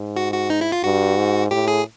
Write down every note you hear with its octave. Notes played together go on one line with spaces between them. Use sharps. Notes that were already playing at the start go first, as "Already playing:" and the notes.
Already playing: G#2
F#4
F#4
D#4
E4
F4
G2 F#4
G#2
A2 G4
G#4